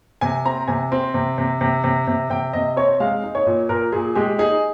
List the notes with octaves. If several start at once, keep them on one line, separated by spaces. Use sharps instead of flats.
C3 G#5
C4 A#5
C3 G#5
C4
C3
C3
C3
C3
C3
C3 G5
C3 D#5
C4 C#5
G#3 F5
D#4
C#5
A#2
A#2 A#4
A#2 G#4
G#3 G4
D#4 G#4